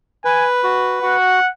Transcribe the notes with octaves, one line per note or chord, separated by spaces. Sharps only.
B4 G#5
F#4
F#4 F#5